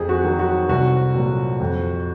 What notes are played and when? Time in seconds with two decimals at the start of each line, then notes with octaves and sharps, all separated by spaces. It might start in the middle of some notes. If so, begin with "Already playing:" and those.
Already playing: F2 G#4
0.09 F#4
0.24 D#3 F#3
0.39 F#4
0.69 C2 F#4
1.15 A#2 F#3
1.60 F2